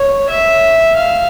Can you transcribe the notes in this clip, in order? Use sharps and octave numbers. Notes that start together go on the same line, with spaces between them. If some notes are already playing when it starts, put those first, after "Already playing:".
Already playing: C#5
E5
F5